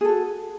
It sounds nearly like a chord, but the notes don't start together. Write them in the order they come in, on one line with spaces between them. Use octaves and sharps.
G#4 A4 F#4